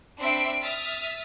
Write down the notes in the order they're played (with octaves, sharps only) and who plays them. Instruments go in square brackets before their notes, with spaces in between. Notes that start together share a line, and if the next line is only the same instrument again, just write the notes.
[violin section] C4 D4 E5 B5 C7 D7
E5 D#6 F6 A6 B6